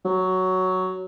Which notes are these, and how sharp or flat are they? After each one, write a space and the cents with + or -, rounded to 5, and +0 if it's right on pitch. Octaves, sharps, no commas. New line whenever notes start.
F#3 +5